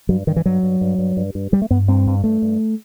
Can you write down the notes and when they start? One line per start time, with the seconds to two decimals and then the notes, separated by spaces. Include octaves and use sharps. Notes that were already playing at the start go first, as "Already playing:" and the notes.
0.09 G2 F#3
0.27 G2 D#3
0.36 E3
0.46 G2 F#3
0.63 G2
0.81 G2
0.98 G2
1.17 G2
1.35 G2
1.52 G2 G3
1.62 A3
1.70 G2 B3
1.88 G2 C4
2.07 G2
2.24 G2 A3
2.42 G2